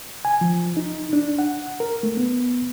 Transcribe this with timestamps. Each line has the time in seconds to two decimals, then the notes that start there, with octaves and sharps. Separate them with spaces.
0.25 G#5
0.41 F3
0.77 D#4
1.13 D4
1.39 F#5
1.80 A#4
2.03 A3
2.17 B3